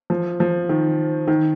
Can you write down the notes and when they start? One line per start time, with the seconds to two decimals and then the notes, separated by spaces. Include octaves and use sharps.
0.10 F3
0.40 F3
0.69 D#3
1.28 D#3